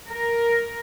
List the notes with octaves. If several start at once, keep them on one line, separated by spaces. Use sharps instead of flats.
A#4